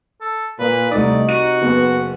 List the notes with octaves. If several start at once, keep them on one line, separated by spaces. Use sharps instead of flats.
A4
A#2 B4
C2 C3 A3 D#4 D5 D#6
F#4 D#7
F#1 B3